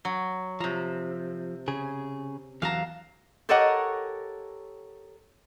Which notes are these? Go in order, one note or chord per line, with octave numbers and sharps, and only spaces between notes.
F#3
C3 F3 A#5
C#3 G#4
E2 E3 F#3 F5 A5 A#5
G4 A4 A#4 C#5 D#5 F#5